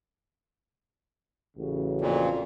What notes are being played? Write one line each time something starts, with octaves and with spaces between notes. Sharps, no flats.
A1 C#3 F#4
F2 A#2